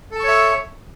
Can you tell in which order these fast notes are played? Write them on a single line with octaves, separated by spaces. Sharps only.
A4 A5 C#6 C#5 E5